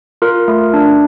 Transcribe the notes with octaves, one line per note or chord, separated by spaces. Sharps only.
F4 A#4
A3
D4